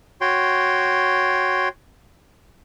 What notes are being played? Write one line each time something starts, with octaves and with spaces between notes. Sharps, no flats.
F#4 C#5 G5 C6